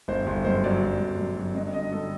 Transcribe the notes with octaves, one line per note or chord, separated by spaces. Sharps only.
G1 C5
G1
F#2 C5
F#3 D5
G1
G1
F#2
F#3
G2 D#5
D3 D#5
G3 A4